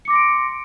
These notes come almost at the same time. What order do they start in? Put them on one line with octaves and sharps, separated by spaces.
C#7 D6 A#6 C6 D7